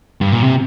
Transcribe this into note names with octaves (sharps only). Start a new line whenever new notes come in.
G2
A#2
C3